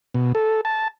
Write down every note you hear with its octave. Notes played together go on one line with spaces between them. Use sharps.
B2
A4
A5